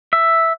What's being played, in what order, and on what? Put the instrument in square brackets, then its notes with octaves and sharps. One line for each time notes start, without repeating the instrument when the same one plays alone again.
[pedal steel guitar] E5